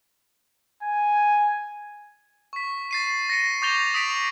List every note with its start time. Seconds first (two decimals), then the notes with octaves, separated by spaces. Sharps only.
0.83 G#5
2.53 C#6 B6
2.91 A6 C7 D#7
3.30 A#6 C#7 D#7
3.62 C#6 D6 G6 A6 F7 G7
3.94 D#6 B6 D7 F7